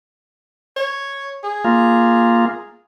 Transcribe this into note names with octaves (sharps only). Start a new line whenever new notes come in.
C#5
G#4
A#3 F4